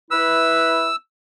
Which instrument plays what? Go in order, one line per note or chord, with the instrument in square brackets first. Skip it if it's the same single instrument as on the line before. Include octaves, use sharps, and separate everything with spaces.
[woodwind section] E4 B4 [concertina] E6